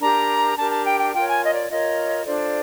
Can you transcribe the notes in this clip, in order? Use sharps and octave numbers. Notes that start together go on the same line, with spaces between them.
D4 G4 A#4 A#5
D4 G4 A#4 A5
A5
G5
G5
F4 A#4 C#5 G5
G#5
D#5
D5
F4 A#4 C#5 D#5
D4 F4 A4 C5 D5